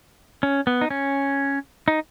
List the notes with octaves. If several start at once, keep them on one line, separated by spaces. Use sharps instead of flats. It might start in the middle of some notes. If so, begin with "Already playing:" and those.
C#4
B3
D#4
C#4
D#4